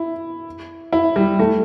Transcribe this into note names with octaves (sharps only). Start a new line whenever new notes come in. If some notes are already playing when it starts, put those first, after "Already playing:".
Already playing: E4
E4
G3
A3